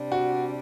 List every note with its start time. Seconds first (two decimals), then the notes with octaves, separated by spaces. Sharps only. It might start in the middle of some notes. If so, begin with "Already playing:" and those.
Already playing: C3 G3 D4
0.12 F#4